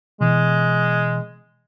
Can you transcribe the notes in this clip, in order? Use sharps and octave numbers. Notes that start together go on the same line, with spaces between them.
B2 E3 G#3